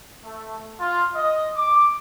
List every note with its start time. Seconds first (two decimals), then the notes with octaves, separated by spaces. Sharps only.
0.23 A3
0.80 F4
1.15 D#5
1.56 D6